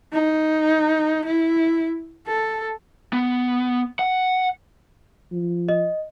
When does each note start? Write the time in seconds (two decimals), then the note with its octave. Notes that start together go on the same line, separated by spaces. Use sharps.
0.13 D#4
1.25 E4
2.27 A4
3.13 B3
3.99 F#5
5.32 F3
5.68 D#5